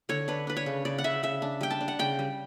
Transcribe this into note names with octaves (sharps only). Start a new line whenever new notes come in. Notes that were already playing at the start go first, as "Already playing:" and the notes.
D3 C#5
D4 B4
D4 B4
C#5
C#3
C#3 D5
F#5
C#3 E5
C#3 E5
D4
G3 G5
A5
D4
F#5
C#3 G5
G3